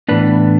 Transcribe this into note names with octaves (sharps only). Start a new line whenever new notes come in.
A2 E3 B3 D4 B4